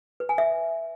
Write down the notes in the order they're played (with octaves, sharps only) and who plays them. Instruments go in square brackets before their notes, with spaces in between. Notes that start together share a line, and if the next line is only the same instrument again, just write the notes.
[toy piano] B4
G#5
E5